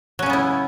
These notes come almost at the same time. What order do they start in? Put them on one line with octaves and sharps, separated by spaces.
F#3 C#4 C#3 B3 E4